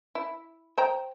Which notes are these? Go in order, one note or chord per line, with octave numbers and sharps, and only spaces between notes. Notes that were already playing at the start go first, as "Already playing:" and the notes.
E4
C5 G5 A#5